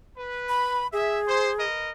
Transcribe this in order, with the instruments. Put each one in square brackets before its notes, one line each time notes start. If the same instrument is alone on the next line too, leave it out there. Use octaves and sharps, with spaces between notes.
[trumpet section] B4
[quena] B5
[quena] G#4 [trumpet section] E5
[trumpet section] C5
A#4 B4 D#5